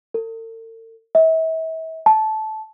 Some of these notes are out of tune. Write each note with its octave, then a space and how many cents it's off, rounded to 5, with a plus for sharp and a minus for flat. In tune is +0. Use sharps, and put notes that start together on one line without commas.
A4 +45
E5 -40
A5 -15